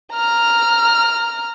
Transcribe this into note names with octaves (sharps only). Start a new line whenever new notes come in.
A#5 F6